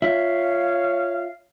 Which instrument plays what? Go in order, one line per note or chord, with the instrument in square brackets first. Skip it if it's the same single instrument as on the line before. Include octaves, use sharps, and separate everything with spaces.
[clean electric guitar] F4 E5 [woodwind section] C#5 F5